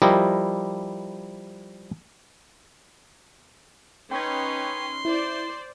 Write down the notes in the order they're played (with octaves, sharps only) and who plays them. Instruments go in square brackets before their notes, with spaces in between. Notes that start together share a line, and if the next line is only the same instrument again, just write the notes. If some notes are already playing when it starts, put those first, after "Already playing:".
[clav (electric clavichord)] F3 G3 E4 G4 A#4 D#5
[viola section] C#4 D#4 B4 [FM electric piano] G5 C#6 G#6 [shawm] C6
[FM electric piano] E4 [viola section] C5 D5